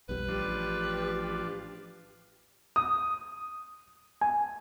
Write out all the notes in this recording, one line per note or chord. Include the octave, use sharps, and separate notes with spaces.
B1 F2 G3 B4
A1 F3 D4 G4
D#6
G#5